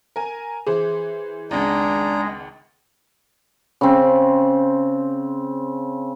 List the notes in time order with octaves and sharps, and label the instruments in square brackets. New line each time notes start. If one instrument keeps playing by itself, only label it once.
[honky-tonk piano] A#4 G#5
[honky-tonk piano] E3 C5 [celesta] G#4
[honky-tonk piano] G#1 C#2 [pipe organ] G#3 [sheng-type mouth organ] D4 A#5
[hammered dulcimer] C#3 C4